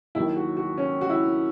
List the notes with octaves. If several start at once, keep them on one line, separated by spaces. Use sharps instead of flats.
D#2 D#3 F#3 E4
F#4
F#4
C#4
F#4
E4